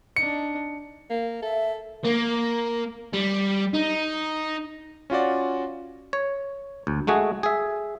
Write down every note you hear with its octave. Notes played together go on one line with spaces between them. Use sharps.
D4 D#4 C#7
A#3
A4 E5
A#3
G3
D#4
C#4 F4 F#4 D5
C#5
D2
G#3 A3 F#4 G#4
G#4 E5